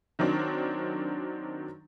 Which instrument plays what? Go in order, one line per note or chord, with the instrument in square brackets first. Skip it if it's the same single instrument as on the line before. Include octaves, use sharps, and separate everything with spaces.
[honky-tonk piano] D#3 F#3 C4 D4